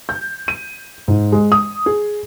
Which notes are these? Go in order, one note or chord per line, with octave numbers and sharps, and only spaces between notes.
G6
D#7
G#2
G#3
D#6
G#4